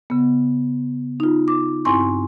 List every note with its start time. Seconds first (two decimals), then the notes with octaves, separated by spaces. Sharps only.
0.10 C#3 B3
1.20 D#4 F4
1.48 D6
1.85 G2 C4 E4 G#5 C6 C#6